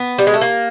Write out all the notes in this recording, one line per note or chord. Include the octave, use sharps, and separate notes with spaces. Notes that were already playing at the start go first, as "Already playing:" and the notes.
Already playing: B3
G3
G#3
A3
A#3